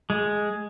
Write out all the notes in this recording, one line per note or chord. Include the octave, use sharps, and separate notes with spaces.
G#3